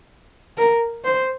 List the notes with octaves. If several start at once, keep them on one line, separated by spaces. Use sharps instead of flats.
A#4
C5